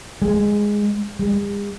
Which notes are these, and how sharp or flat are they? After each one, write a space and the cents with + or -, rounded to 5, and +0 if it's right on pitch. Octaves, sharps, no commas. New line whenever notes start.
G#3 -5
G#3 -45